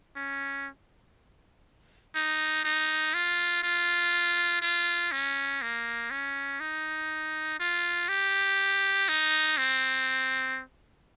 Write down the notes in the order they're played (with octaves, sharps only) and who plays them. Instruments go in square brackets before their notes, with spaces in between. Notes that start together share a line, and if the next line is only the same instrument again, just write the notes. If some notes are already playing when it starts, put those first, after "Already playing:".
[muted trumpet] C#4
D#4
D#4
F4
F4
F4
C#4
A#3
C#4
D#4
F4
G4
D#4
C4